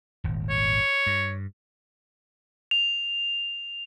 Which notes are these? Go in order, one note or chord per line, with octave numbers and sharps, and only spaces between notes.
D#1 G#1
C#5
G2
F7